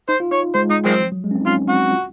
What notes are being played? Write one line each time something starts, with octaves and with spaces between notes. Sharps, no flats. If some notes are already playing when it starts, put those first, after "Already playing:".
D#4 C5
F4
D#4 C#5
G#3 C5
G#3 D#4
D#3 F#3 G#3 C4
F3
F#3
G#3
C#4
C4
D#4
C#4 F4
C4
C4 F#4
F4